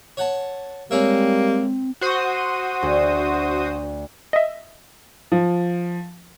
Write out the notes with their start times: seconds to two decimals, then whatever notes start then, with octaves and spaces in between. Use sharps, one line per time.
0.17 C#5 F#5 A5
0.91 G3 G#3 A#3 C4 C#5 E5
2.01 F#4 C5 D#6
2.83 D2
4.33 D#5 E5
5.32 F3